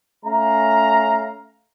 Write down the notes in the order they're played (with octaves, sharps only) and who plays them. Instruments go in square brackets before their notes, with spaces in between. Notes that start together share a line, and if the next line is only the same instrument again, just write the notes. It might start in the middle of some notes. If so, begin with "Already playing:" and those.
[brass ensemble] A3 C#4 F5 A#5